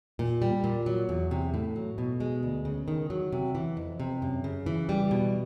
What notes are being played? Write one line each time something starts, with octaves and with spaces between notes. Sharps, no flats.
A#2
G3
A#2
F#3
E2
C3
A2
F#3
B2
G#3
D2
C#3
D#3
F#3
C3
E3
F2
C3
F#2
C#3
E3
G3
B2